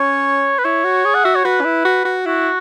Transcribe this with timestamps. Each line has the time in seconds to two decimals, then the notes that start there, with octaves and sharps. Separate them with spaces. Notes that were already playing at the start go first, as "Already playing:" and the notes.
Already playing: C#4 C#5
0.59 B4
0.65 E4 C#5
0.84 F#4
1.05 G#4
1.14 F#5
1.24 F#4 E5
1.35 C#5
1.45 F#4 B4
1.61 C#4
1.65 E4
1.85 F#4
2.05 F#4
2.26 E4 F#4